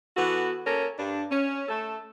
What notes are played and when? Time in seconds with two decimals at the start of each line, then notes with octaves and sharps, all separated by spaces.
0.16 E3 B3 F#4 A4
0.66 A#3 C#4 A4 A#4
0.98 G2 D4
1.31 C#4
1.69 A3 A4